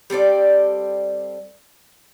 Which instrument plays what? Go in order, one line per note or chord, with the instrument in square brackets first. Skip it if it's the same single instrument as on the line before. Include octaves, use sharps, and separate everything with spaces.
[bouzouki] G3 C4 A4 D5